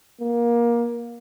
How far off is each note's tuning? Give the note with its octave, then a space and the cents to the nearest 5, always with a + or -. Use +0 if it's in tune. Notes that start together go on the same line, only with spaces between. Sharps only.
A#3 +20